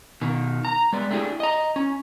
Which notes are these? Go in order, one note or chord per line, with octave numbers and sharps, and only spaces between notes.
B2 D#3
A#5
G#3 B3 D5
A3 C4 D4 E4 G4 G#4
D#5 A#5
C#4